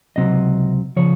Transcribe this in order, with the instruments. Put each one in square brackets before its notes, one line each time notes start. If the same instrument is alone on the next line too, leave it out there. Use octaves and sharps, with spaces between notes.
[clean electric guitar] C#2 C3 F#3 C4 D#5
C#3 F3 C#5